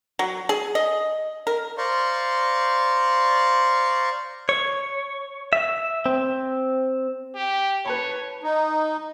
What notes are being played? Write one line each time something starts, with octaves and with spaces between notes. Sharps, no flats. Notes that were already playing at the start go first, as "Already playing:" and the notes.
F#3
G#4
D#5
A#4
C5 D5 F5 A#5 C6 C#6
C#5
E5
C4
G4
B4 C#5 A5 B5
D#4